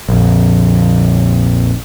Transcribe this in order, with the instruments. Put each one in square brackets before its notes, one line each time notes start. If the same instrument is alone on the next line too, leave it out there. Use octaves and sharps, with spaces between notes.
[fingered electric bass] A#1 F2